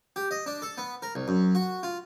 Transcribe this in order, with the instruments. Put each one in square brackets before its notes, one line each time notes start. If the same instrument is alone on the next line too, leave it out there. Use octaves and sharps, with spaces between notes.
[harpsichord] G4
D#5
D4
A4
B3
A#4
C2
F#2
F#4
F4